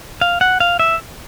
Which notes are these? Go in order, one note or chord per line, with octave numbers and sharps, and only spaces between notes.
F5
F#5
F5
E5